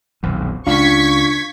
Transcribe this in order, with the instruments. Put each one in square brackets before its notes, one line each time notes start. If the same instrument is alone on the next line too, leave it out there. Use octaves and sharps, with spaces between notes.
[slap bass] D#1 B1 F2
[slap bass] C#2 [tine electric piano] D4 F4 F5 [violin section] C#6 G#6 B6